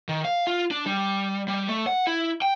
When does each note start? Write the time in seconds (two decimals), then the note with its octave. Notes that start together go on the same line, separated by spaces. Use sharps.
0.09 D#3
0.25 F5
0.47 F4
0.71 D4
0.86 G3
1.48 G3
1.68 A3
1.87 F#5
2.07 E4
2.42 G5